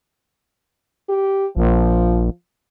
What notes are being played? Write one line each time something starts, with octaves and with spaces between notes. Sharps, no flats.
G4
A#1 F3